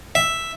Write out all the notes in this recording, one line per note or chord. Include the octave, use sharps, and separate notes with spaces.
E5